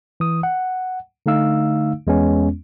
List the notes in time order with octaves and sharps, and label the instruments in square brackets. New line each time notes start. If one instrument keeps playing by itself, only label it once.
[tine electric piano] E3 D#6
F#5
D3 A3 D#4 F5 E6
E2 G#3 B3 C#4